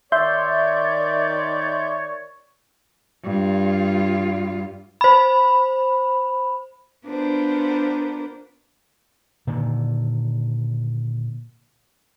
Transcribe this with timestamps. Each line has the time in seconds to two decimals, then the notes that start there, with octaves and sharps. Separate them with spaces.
0.12 D#3 C#5 D5 E5 C6 G6
3.24 G2 F4
5.01 C5 B5
7.07 B3 D4 F4 A#4 C5
9.47 A#2 D3 D#3